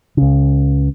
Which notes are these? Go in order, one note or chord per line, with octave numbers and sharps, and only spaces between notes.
C#2 C#3